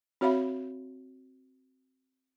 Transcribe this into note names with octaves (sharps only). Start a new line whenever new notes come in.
C4 F#4 C#5 E5 F5 B5